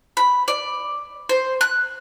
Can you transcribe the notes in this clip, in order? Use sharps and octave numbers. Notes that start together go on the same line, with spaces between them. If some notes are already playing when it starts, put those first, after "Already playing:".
B5
D5
C5
F#6